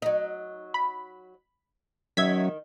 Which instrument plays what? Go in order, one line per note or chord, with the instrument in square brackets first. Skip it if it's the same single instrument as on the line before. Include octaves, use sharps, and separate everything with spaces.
[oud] F#3 D#4
[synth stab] B5
[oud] D#3 [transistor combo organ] F#3 C#4 [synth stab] E5 G#6 B6